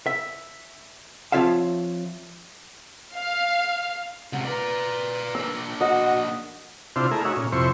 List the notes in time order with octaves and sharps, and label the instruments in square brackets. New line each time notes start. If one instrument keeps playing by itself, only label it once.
[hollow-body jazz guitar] E5
F3 C4 F4 C#5 E5 F5
[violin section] F5
[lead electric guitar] C#2 C3 [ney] F#5
[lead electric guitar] A#4 D5 [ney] B4
[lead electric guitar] A#3 D4 [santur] E6
[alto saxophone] F#4 [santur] D#5 [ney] F#5
[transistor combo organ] C3 D4 E4 F4 C5
A3 E4 G#4 A#4
D#4 F#4 C#5 E5
A#2 C#4
F2 C3 E4 C5 C#6